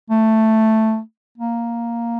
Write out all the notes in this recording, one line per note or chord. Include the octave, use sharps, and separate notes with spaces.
A3
A#3